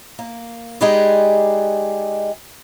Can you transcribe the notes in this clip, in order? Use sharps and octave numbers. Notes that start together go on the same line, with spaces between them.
A#3
G#3 D#4 G4 G#4 B4 D5